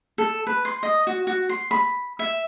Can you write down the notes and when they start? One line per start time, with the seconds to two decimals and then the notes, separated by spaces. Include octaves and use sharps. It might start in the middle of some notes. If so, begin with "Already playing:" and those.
0.18 A4
0.47 B4
0.65 C6
0.83 D#5
1.07 F#4
1.27 F#4
1.49 C6
1.71 B5
2.19 E5